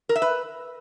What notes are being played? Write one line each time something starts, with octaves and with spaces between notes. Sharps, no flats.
A#4
E5
B4